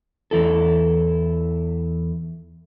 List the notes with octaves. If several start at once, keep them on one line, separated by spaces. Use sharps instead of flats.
E2 E3 E4 A4